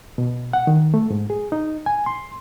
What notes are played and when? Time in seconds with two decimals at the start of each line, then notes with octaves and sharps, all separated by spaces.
0.18 B2
0.53 F#5
0.67 D#3
0.94 A3
1.10 G#2
1.30 G#4
1.52 D#4
1.86 G#5
2.06 C6